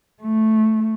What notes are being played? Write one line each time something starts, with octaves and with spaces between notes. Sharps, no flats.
A3